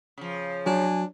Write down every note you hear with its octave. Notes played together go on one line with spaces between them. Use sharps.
C#3 F3
F#3 D4 G#5